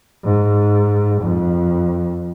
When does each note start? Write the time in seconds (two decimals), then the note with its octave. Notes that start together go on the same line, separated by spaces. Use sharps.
0.25 G#2
1.21 F2